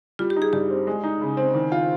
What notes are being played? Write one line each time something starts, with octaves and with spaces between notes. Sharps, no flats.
G3 F4
G4
D#4
G#4
G2 G4
C4
G#3
D#4
C#3
C4
D#3
F4